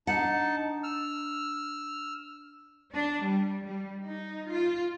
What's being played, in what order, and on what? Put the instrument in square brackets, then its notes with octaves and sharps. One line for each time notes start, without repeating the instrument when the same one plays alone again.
[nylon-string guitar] D4 F#5 [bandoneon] D#4 A5
[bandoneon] E6 F6
[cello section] D4
G3
G3
D#4
F4